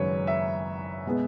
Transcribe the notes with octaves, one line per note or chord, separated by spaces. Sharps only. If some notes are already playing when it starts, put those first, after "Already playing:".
Already playing: G#1 F#2 C#3 F#3 B4 C#5
E5
B2 G#3 B3